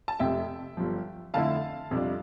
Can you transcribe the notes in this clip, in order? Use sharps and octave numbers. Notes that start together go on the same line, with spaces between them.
A5
F1 F2 C3 E5 G5
G1 G2 F3
F2 D3 A3 E4 F5 A5
F2 C3 G3 D4 F4